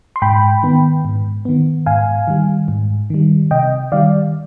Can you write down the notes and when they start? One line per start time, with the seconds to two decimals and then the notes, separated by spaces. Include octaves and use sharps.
0.16 C6
0.22 G#2 G5 B5
0.63 D#3 B3
1.05 G#2
1.45 D#3 B3
1.86 G#2 F5 G#5
2.28 D#3 G3
2.68 G#2
3.10 D#3 G3
3.51 C3 D#5 G5
3.92 D#3 G3 D5 F5